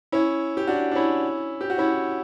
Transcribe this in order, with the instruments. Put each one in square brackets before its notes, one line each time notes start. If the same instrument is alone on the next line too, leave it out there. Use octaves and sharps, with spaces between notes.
[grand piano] C#4 E4
G4
D4 F#4
D4
C#4 E4
G4
F#4
C#4 E4